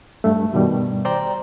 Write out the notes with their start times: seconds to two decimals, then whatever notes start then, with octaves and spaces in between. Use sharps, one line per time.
0.24 G2 A3
0.53 G2 B2 D#3 G3
1.05 C5 D5 G5 A#5